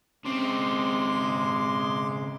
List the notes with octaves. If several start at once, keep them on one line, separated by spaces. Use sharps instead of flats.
C#3 G#3 C4 C6 D6